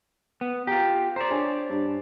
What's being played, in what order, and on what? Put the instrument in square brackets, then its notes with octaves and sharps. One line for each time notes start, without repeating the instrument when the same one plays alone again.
[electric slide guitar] B3
[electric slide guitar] F4 G4 [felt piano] A#5
[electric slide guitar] C5 D5 [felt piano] A#5
[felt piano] D4 C#5 G#5
G2